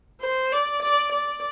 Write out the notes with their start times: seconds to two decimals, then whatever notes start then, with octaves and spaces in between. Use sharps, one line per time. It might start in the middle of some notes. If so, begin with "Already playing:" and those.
0.21 C5
0.52 D5
0.82 D5
1.12 D5